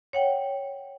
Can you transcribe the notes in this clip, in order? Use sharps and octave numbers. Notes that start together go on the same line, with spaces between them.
C#5 F#5 G5